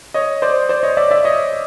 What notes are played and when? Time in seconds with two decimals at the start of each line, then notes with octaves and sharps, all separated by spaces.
0.14 C#5 D#5
0.42 C5 D5
0.69 C5 D5
0.83 C#5 D#5
0.97 D5 E5
1.11 D5 E5
1.24 C#5 D#5